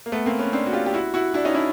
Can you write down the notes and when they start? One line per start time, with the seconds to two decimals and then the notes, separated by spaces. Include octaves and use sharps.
0.06 A#3
0.12 A3 B3
0.26 A#3 C4
0.39 B3 C#4
0.53 C4 D4
0.66 F#4
0.73 F4 G4
0.86 G4
0.94 E4 F#4
1.14 E4 F#4
1.34 D4 E4
1.45 C#4 D#4
1.55 D4 E4